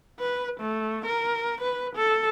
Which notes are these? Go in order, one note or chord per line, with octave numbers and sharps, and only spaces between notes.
B4
A3
A#4
B4
A4